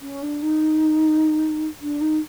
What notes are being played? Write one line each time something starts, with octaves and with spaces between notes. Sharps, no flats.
C#4
D4
D#4
D4
D#4